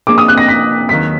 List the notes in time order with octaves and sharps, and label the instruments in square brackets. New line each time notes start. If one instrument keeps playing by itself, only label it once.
[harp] F3 A#3 D4 G#4 [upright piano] D6
[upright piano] D#6
F#6
A#6
B6
[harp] D#2 D#3 F#3 [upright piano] B6